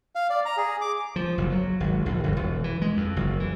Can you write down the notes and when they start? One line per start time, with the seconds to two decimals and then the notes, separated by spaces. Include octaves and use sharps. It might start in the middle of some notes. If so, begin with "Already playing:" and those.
0.15 F5
0.30 D5
0.45 A#5
0.57 G#4
0.81 D6
1.16 F3
1.38 F#1
1.52 F#3
1.80 G#1
2.06 A#1
2.24 G1
2.36 E1
2.64 E3
2.82 G#3
2.97 F2
3.16 F#1
3.40 E3